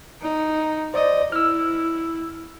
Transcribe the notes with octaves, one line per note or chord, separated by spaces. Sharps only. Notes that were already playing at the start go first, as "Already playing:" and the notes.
D#4
C5 D5 D#5
E4 E6 F6